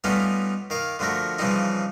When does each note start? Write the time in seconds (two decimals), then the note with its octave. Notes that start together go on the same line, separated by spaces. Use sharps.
0.04 G3 A3 B3 C#4 D#4 F4
0.70 D#3 F5 D6
0.99 D3 F3 A3 F#4 A#4
1.39 C#3 E3 F3 G3 C4 D#4